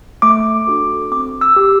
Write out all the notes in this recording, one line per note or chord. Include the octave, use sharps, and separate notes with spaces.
A3 D6
D4 F#4 A4
C4 D6
E6
G4